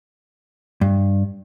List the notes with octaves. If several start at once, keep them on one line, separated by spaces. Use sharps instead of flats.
G2